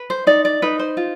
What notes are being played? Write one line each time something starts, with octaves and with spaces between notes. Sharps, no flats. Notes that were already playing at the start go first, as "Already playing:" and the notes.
Already playing: B4
C5
D#4 D5
D5
D#4 B4
C5
F4